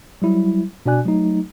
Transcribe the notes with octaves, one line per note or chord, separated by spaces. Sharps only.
F#3 G3 E4
B2 D4 F#4 D5 G#5 F#6
F#3 A3 D#4